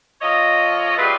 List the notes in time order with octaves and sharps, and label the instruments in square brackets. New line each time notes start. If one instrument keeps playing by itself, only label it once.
[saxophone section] F3 A4 C#5 D#5
F#3 G3 A3 F4 G#4 B4